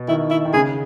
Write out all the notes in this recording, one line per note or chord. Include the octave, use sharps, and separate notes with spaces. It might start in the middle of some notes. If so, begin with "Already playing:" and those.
Already playing: B2
D#3 E4
E4
D#3
C#3 G#4